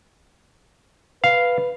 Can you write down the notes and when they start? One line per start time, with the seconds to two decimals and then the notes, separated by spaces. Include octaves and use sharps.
1.24 B4 F5